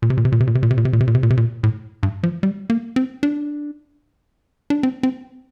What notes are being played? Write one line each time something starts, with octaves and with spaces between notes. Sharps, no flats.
A#2
C3
A#2
C3
A#2
C3
A#2
C3
A#2
C3
A#2
C3
A#2
C3
A#2
C3
A#2
C3
A#2
A2
G2
F3
G3
A#3
C4
D4
D4
C4
C4